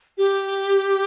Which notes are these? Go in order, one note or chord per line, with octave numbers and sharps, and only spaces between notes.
G4